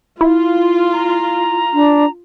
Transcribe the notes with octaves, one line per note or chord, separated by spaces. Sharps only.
E4 F4
A#5
D4